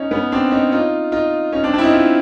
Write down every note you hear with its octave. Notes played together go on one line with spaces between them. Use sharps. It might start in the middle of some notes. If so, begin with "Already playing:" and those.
Already playing: C#4 D#4
B3 C#4
C4 D4
C#4 D#4
D#4 F4
D#4 F4
C#4 D#4
C4 D4
C4 D4
E4
C#4 D#4
D#4 F4